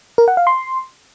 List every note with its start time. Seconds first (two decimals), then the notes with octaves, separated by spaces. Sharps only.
0.18 A#4
0.28 F#5
0.37 F5
0.47 C6